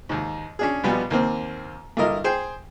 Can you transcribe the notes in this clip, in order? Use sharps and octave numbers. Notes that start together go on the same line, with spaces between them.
D#2 G#2
C#4 D4 G#4
A#1 B2 G3 B3 B4 G#5
D#2 A#3 C4
G2 D3 E4 A#4 D#5 F6
G#4 C5 G5